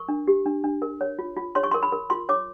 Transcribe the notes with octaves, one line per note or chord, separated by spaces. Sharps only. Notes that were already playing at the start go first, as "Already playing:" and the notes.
Already playing: A#4 C#6
D4
G4
D4
D4
A#4
C#5
F4
F4
C#5 C6
C#6
C6
A#4
B5
A#4
F4 C6
C#5 D6